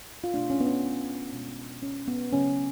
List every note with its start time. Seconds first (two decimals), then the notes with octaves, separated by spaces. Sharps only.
0.24 F4
0.34 B2 A3 D4
0.50 C#4
0.60 B3
0.67 C#4
1.33 B2 G#3
1.83 C#4
2.08 B3
2.33 C#3 F#3 A3 C#4